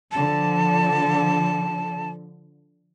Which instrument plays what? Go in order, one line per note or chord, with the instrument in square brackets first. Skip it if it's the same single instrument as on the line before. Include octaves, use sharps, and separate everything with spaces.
[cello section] D3 F3 [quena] A5